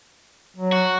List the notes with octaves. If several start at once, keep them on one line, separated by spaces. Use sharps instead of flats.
F#3
F#4